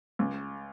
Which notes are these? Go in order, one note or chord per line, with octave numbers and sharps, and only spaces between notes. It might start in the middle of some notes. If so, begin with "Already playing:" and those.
C#2